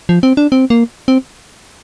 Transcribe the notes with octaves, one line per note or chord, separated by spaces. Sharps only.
F3
C4
D4
C4
A#3
C4